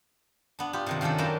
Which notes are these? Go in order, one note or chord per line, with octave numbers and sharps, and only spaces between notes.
B3 D4
B3 F4 G4
C3 D#3 F3
D#3 F3 C#4 D4 A4
F#2 F#3 A#3 F#4 G5 A5